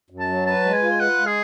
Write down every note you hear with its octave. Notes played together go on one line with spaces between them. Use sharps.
F#2
A5
F#3
B4 A5
G#3
G#5
F4
B4 F#5
G#3
G#4